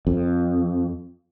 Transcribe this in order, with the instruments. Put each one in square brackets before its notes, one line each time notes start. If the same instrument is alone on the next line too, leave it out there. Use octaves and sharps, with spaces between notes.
[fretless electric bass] F2